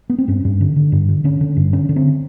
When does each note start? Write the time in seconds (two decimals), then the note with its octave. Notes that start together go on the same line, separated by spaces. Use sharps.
0.10 B3
0.18 C4
0.28 G2 C#4
0.45 G2
0.61 D3
0.76 D3
0.92 G2
1.09 D3
1.24 D3 C#4
1.41 D3
1.56 G2
1.73 D3 C#4
1.89 D3
1.96 C4